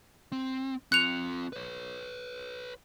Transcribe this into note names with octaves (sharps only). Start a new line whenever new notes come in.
C4
C4 F4 F#6 C#7 F7
B4 C#5